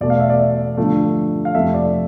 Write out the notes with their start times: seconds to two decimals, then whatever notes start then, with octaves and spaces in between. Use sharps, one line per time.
0.01 E2 B2 A3 D5
0.10 F5
0.20 E5
0.30 D5
0.39 E5
0.77 G2 D3 F3 A3
1.45 F5
1.55 F2 C3 F3 A3 E5
1.74 D5